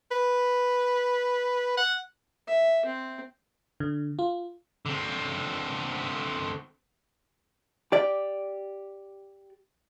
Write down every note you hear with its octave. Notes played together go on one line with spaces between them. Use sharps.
B4
F#5
E5
C4
D3
F4
D3 C4
G4 D5